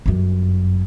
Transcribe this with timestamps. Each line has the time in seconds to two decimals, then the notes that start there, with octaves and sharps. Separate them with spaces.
0.06 G1 F#2